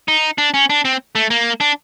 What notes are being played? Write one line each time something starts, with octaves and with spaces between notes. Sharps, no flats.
D#4
D4
C#4
D4
C4
A3
A#3
D4